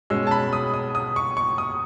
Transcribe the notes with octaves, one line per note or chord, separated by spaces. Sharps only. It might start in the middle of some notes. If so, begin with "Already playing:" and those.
B2 G#3 C#4 E6
A5
B5
D#6
D#6
D#6
C#6
C#6
D#6